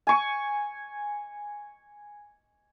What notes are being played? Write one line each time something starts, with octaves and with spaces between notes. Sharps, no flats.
G#5 C#6